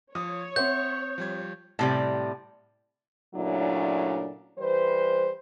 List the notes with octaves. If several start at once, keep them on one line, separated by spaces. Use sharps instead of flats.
F3 C#5 D#6
C4 C5 E5 F#5 C6 G6
F3 G3 G#6
A2 C3 G3
A#2 C#3 F#3 A3 D4 E4
E3 G3 B4 C5